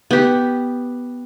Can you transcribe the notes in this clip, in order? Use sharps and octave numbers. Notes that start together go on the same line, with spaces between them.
B3 G4